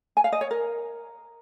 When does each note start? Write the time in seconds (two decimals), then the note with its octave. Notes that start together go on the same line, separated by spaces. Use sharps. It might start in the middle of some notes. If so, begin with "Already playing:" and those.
0.17 G#5
0.24 F5
0.32 D#5
0.41 C#5
0.51 A#4